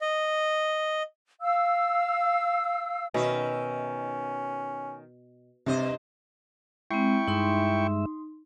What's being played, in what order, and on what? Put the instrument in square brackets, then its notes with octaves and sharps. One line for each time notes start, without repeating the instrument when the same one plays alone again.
[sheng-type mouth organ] D#5
[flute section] F5 E6
[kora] B2 [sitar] D#3 E5 [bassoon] C#4
[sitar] G2 C5 D#5 [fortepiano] C3
[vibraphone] G#3 C4 [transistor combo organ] E4 G5 C#6
[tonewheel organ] G2 G#3 E5 [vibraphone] D#4 C6